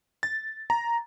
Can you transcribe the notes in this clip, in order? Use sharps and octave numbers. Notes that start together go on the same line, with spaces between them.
A6
A#5